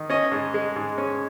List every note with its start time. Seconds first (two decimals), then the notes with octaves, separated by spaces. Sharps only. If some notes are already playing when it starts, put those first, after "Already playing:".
Already playing: D#3
0.10 C#4 D#5
0.32 G#2
0.54 G#3
0.76 G#2
0.98 C#4